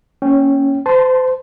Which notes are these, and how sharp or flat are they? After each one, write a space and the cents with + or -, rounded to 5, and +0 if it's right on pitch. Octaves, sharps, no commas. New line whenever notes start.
A#3 +0 C#4 +0 G5 -10
C5 -35 A5 +0 C6 +0